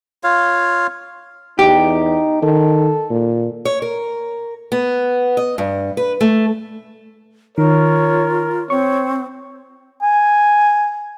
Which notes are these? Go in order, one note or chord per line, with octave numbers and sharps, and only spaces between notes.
F4 C#5 F5
E2 D#4 G4
D#3 A4
A#2
C#5
A#4
B3
D#5
G2
B4
A3
D#3 F4 A#4 C#5
C4 C#5 C#6
G#5